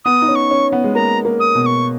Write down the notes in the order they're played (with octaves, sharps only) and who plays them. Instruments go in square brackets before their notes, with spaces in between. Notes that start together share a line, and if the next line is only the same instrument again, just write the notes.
[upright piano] B3 [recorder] D#6
[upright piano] D#4
C#4
[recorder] C#6
[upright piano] C#4
B3
G#3
[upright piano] A#3 [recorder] A#5
[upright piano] A#3
[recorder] D#6
[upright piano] B2
[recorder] D#6
C#6